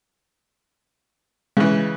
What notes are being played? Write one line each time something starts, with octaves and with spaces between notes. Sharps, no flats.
C#3 E3 G#3